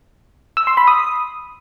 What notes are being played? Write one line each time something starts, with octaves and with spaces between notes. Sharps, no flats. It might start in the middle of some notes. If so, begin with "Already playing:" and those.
E6
C6
B5
D#6